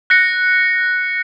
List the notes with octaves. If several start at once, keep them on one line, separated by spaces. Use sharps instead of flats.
F#6 A#6 C#7